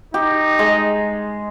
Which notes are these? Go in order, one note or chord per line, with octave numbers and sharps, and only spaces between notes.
D#4 G4
G#3